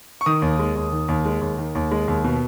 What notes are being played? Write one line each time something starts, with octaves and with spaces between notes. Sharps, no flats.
C#6
D#3 D#6
D#2
G#3
D#2
D#3
D#2
G#3
D#2
D#3
D#2
G#3
D#2
B2